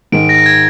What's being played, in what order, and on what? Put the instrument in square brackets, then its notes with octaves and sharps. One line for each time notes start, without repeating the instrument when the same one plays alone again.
[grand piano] G#2 D#3 G#3 [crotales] D7
[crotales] A#6
G#6